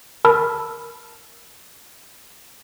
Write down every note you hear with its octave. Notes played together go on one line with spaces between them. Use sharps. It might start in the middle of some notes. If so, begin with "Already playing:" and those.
A#4 A5 B5 E6 F6